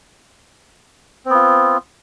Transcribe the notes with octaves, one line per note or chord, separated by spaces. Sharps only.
B3 C4 F4